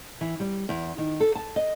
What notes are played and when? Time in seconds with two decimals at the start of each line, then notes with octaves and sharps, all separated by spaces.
0.21 E3
0.40 G3
0.69 E2
0.98 D#3
1.20 A4
1.35 A5
1.56 D#5